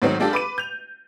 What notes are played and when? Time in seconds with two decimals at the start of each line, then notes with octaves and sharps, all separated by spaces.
0.02 G#2 D#3 F#3 A3 C4 D#4
0.20 G#3 D4 F4 G4 A4
0.33 B4 D6 D#7
0.58 G6 F7